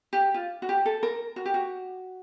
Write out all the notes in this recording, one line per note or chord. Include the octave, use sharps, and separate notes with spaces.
G4
F4
F#4
G4
A4
A#4
F#4
G4
F#4